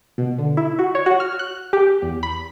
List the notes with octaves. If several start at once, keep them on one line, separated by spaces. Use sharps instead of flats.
B2
D3
E4
F#4
C#5
F#4
F6
F#6
G4
E2
B5